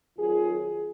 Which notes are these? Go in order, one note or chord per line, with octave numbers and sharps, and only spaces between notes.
F2 D#3 F#3 F4 G#4